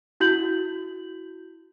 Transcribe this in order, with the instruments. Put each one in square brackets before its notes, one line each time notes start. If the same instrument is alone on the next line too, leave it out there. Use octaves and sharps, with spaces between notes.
[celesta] E4 F#4 G6 F#7